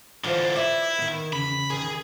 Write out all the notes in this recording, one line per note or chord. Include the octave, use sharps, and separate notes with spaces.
D3 E3 F4 C5
E4 B4 D5 E5
D#3 B3
E2 C#3 B5
E2 D#3 G#4